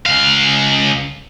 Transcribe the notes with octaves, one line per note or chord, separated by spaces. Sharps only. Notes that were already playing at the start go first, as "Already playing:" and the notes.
C#2 F5